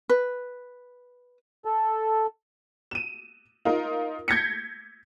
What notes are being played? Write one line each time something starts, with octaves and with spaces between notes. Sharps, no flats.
B4
A4
D#7 E7
D#4 F4 A#4
G6 G#6 A#6 B6 C#7